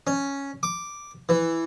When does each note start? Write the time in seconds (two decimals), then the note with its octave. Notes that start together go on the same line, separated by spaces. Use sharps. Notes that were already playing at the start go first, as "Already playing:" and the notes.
0.07 C#4
0.63 D6
1.29 E3